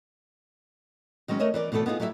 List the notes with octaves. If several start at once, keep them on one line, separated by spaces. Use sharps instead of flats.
D#3 F#3 G#3 C#4
A3 A#4 C#5 D#5 E5
E3 A#4 D5
B2 E3 A3 B3 A4
B3 D#4 F4 G#4
F#3 G3 E4 D5 E5